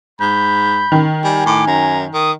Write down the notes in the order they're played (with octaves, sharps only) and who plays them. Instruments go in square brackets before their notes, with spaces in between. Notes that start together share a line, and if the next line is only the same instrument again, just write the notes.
[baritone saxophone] G#2 [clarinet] B5 [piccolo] G6
[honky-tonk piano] D#3
[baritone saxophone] G3 [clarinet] G#5
[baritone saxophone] A2 [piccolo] D6
[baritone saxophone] F#2 [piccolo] A#5
[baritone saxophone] D#3 [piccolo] D#6